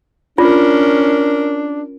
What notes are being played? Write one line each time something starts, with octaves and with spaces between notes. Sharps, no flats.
C#4 D4 F4 A#4